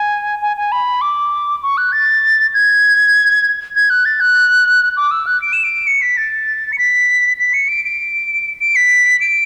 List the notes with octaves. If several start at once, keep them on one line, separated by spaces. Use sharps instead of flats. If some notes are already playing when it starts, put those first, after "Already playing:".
Already playing: G#5
G#5
G#5
B5
D6
C#6
F#6
A6
G#6
G#6
F#6
A6
F#6
D6
E6
F#6
D7
E7
D7
C#7
B6
A6
C#7
B6
B6
C#7
D7
D7
D7
B6
D7